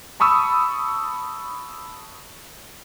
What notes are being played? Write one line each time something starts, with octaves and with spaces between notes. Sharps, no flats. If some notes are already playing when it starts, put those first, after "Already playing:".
A5 B5 C#6 D#6 E6